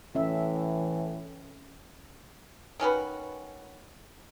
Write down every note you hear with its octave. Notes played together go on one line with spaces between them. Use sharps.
A2 E3 C#4 E5
D#3 C#4 F#4 B4